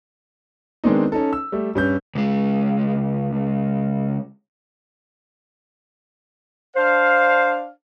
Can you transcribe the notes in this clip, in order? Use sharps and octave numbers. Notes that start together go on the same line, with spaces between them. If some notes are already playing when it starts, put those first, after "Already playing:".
D#3 G#3 B3 C4 D4 D#4
C#4 D#4 A4
E6
G3 A3
G2 C#4 G6
C#2 G#3
D4 C5 F5